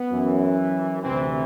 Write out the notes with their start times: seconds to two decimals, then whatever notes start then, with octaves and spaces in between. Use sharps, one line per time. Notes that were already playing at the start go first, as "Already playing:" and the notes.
Already playing: B3
0.11 F#2 E3
1.02 D2 C3 E3 C4